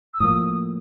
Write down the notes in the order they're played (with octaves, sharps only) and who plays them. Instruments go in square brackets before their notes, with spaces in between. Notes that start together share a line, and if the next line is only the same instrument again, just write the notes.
[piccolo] E6
[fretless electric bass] A2 F3 A#3 [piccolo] D#6